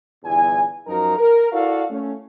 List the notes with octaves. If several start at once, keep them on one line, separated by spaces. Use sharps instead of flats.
G1 E2 G2 E4 G#5
F#2 F3 D#4 F#4 A#4 A#5
A#4
E4 F#4 A4 D5 F5
A3 C#4